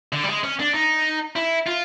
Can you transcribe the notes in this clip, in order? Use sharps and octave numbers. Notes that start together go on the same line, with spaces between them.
D3
G3
G#3
C#4
D4
D#4
E4
F4